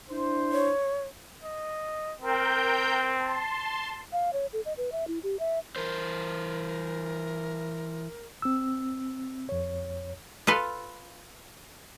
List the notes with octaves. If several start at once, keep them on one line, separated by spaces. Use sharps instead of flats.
D4 E4 C5
C#5
D#5
C4 A#4 G5 G6
A5 C6
F5
C#5
A4
D#5
B4
E5
E4
G4
E5
E3 A#4 C5
C4 E6
F2 C#5
F4 A4 B4 F5